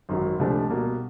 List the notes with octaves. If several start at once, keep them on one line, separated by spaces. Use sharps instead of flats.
G#1 F#2 D#3 F#3
C#2 C3 F3 A3 D4
B2 G3 A#3